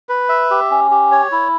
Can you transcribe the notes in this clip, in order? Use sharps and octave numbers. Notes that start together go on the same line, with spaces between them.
B4
E5
G4
C#4
G4
C#5
E4